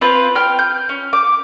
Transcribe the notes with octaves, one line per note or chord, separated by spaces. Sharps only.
C4 F4 B4
G5 F6
G6
C#4
D6